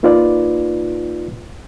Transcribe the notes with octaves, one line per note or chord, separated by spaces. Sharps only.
A#3 D#4 F4 B4 D5